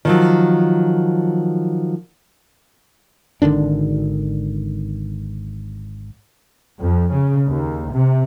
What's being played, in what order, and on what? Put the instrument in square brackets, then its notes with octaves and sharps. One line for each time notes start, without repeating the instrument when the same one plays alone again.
[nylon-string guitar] D#3 F3 F#3
[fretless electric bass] G#1 D3 D#3 D4
[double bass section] F2
C#3
D#2
C3